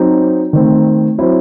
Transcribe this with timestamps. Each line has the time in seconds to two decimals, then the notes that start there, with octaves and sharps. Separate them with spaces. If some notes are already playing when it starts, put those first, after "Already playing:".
Already playing: F#3 C4 D#4
0.53 D#3 A3 C4
1.18 F#3 C4 E4 C5